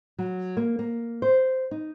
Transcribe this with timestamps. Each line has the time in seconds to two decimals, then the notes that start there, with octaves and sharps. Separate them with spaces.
0.19 F#3
0.57 A#3
0.79 A#3
1.22 C5
1.71 D#4